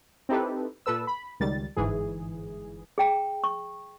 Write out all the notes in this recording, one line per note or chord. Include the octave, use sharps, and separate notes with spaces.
C4 D#4 E4 G4 A4 B4
A#2 A4 B4 E6
B5
C#2 D#3 G3 A6
G1 G#2 E3 G#4
G#4 G5 A#5
C#6